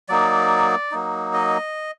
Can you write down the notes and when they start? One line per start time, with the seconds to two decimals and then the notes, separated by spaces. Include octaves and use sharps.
0.09 F#3 A#3 D#4 D5
0.91 F#3 A#3 D#4
1.34 D#5